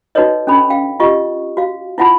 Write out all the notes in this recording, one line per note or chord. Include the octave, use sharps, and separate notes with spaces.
D#4 F#4 A4 B4 C#5 D#5
C#4 D4 A4 B5
F5 G5
F4 G4 D#5 C#6
F#4 F5
E4 F4 F#5 A5 B5